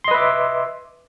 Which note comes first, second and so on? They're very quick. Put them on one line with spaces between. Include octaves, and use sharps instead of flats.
C6 D#5 B4 E5 D6